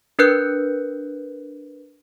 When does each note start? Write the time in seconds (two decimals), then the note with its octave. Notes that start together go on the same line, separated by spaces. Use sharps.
0.19 D4 A#4 B4 F#6 G6 C#7